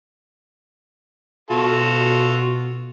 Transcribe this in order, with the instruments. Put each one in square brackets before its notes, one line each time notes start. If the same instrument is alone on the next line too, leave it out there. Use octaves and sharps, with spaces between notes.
[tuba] B2 [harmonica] F4 F#4 A4